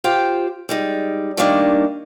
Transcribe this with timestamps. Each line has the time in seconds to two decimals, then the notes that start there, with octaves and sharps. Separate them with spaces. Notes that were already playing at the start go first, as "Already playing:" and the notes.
0.04 F4 G4 C5 G5
0.69 G3 G#3 D#4
1.37 D#3 G3 A3 A#3 D4 D#4